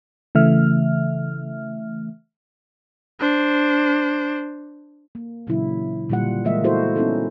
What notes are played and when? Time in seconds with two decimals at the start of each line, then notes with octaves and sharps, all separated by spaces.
0.35 C#3 E3 A3 E5 F6
3.20 D4 C5
5.15 A#3
5.47 A#2 C#3 E3 F#3 D4 E4
6.09 A#2 D3 G3 F4 F#5
6.44 E3 G#3 A#3 D#5 E5
6.64 B3 E4 F#4 A4 C5
6.96 B3 C#4 D#4 E4 A4